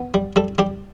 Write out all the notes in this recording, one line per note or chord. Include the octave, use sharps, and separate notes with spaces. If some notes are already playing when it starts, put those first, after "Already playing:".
Already playing: B3
G3
G3 A4
G3 G4